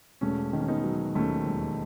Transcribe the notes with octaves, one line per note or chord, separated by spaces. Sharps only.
E1 A3 C#4
D#3
C#4
B3 D#4
F#3
D#2 A3 C#4
E1